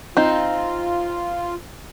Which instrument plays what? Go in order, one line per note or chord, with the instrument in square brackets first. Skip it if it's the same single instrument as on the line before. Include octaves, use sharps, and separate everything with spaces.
[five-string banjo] C4 D#4 [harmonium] F4